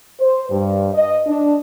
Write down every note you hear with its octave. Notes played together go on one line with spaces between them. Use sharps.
C5
G2
D#5
D4